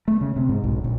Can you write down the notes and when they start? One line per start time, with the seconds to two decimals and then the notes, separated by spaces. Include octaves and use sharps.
0.08 A3
0.21 C#3
0.36 C3
0.49 G#2
0.64 B1
0.84 A#1